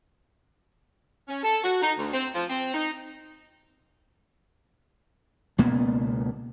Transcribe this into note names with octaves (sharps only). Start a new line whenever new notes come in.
C#4
A4
F#4
D#4
D2
C4
F3
C4
D#4
C#2 B2 A#3 B3